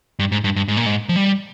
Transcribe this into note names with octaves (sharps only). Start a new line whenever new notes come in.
G2
G#2
G2
G2
G#2
A#2
G#2
F3
G3